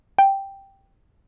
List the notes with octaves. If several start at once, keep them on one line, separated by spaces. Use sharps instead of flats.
G5